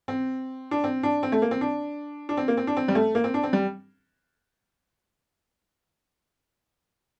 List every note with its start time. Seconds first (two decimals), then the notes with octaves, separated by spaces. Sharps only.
0.08 C4
0.71 D4
0.84 C4
1.03 D4
1.23 C4
1.32 A3
1.42 A#3
1.51 C4
1.61 D4
2.29 D4
2.37 C4
2.48 A#3
2.57 C4
2.67 D4
2.77 C4
2.88 G3
2.95 A3
3.15 A#3
3.24 C4
3.34 D4
3.43 C4
3.53 G3